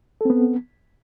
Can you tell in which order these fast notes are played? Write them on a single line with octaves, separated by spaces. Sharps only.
A4 C4 B3